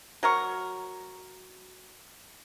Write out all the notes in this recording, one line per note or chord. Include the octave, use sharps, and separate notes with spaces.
F#3 A#4 C#6